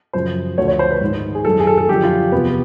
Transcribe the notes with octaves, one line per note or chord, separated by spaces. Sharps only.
F#2 C#3 F3 C5
D2 D3 F3 C#5
C#5
C5
B4
G#2 D#3
G#4
F#2 D#3 A4
G#4
A4
A4
F#2 D3 F3 G4
F4
E2 C3 F3 B3